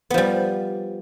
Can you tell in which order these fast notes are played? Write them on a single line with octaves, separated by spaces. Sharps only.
B3 F3 G3